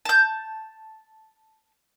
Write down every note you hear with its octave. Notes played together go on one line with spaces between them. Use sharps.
A5 G6